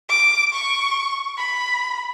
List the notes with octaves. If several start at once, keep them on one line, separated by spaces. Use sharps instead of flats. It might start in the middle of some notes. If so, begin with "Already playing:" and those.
D6
C#6
B5